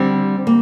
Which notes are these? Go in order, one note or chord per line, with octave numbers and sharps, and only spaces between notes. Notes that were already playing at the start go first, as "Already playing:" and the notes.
Already playing: D3 G3 C4
A#3